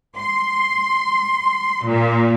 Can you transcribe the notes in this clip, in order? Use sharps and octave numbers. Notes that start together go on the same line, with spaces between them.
C6
A#2